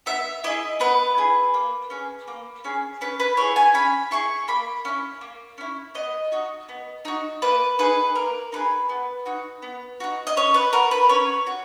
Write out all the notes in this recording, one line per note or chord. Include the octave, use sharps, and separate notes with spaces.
B3 E5
E4 G#4 D#5
B3 B4
E4 G#4
A#3
C#4 G#4
A#3
C#4 G#4
C#4 B4
B4
E4 G#4 C#5
G#5
C#4 B5
E4 G#4 C#6
A#3 B5
C#4 E4
A#3
C#4 E4
B3 D#5
D#4 F#4
B3
D#4 F#4
A#3 B4
D#4 G#4 B4
A#3 A#4
D#4 G#4 B4
B3
D#4 F#4
B3
D#4 F#4
D#5
C#4 C#5
B4
F#4 A#4
B4
C#4 C#5
F#4